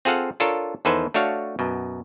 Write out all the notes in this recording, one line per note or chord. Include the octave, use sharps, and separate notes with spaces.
C4 F4 G#4 A4 F5 F#5
D4 F4 A4 A#4 C#5
E2 D#3 A4 B4 C5 G#5
A3 D4 F#4 C#5 F5
F#2 B2